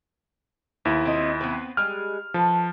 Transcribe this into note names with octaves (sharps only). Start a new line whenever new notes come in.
D#2 B3 E4
C4 F4 D#5
B3 C4 B4
G3 G#3 F6
F3 A4 B4